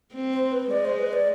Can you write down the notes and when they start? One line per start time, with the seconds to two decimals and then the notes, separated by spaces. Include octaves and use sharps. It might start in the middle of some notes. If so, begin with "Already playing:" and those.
0.14 C4
0.33 C5
0.52 B4
0.70 G#3 D5
0.85 C5
0.99 B4
1.13 D5